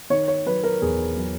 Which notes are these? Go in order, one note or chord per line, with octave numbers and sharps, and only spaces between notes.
D#3 C#5
C#5
F#3 B4
A#4
E2 G#4
F#3